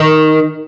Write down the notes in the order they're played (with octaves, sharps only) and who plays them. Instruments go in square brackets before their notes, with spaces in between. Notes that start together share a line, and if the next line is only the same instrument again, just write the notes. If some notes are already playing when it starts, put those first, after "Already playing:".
Already playing: [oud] D#3